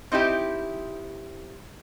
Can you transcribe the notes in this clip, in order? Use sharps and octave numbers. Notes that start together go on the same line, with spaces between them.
C4 D#4 E4 G4 E5